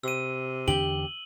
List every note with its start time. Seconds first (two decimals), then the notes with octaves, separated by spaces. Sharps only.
0.04 C3 E6 D#7
0.68 E2 D3 D4 G4 F#7 G7